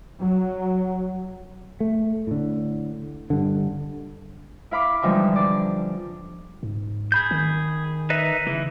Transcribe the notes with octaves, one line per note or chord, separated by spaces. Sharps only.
F#3
A3
A2 D3
G2 D3
E4 F5 B5 D6
D3 E3 F3 G3 G#3 D#4
D4 D5
G#2
G#4 B5 G6
D#3
D#4 B4 E5
C#3 E3